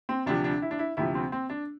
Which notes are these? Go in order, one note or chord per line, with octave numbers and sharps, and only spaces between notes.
C4
D2 C3 F3 D4
D4
E4
D4
E4
D2 C3 F3 E4
C4
C4
D4